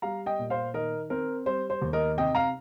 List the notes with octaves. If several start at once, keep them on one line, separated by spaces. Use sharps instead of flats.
G3 F5 A#5
D#5 G5
A#2
C5 F5
D#3 A#4 D#5
C4 A#4
G3 C5
C5
D#2
A#4 D#5
C3 D#5 G5
F5 A#5